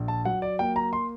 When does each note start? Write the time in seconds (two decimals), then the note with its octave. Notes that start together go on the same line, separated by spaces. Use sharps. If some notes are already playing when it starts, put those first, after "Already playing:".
Already playing: A#1
0.08 A5
0.25 F#3 F#5
0.42 D5
0.59 A#3 G5
0.76 A#5
0.93 C6